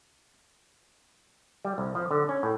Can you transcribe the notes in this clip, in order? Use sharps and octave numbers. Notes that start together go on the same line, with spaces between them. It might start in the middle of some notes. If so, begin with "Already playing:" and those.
G3
C2
F3
D3
C#4
A2